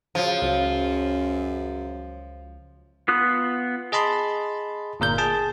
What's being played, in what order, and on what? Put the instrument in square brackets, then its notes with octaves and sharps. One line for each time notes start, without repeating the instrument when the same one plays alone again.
[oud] C#3 F#3 [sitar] F3
[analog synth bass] C#2 [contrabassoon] F#2
[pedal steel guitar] B3 F4 D#6 F#6
[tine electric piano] G#4 D#5 A5 B5 C6
G1 A#2 A#4 G6
G#4 A5